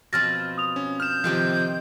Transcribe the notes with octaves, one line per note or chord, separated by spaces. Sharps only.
B2 F3 C4 F6 A6 A#6
D#6 F7
C#4
F6 G6 E7
C3 D#3 F3 C4 G4